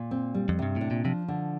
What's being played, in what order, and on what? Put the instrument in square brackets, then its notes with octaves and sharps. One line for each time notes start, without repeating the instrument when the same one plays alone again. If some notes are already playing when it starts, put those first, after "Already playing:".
Already playing: [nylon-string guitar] A#2
C4
G3
[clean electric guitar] F2
[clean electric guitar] G2 [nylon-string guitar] C3
[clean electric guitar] A2 [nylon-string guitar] D4
[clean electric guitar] A#2
[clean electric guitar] C3 [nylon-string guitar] F3
[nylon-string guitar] D3